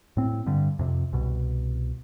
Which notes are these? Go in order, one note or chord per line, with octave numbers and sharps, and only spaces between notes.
A2 C4
G2 D3
F2 C3
C2 B2